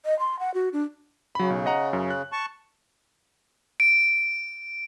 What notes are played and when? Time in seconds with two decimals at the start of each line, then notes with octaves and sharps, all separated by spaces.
0.06 D#5
0.19 C6
0.39 F#5
0.54 F#4
0.73 D4
1.35 C#3 F#3 B5
1.50 B1
1.66 D#5 F#5 A#5
1.93 F#2
2.10 F#6
2.32 A5 C#6
3.80 D7